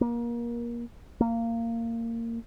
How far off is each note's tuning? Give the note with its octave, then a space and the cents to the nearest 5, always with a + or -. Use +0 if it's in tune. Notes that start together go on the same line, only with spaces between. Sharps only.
A#3 +25
A#3 -20